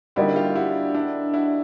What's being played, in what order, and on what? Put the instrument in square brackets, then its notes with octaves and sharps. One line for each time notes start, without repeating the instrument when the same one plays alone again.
[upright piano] D3 G3 A#3 D#4 [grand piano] E4 F#4
[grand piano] F4 G4
E4 F#4
D4 E4
E4 F#4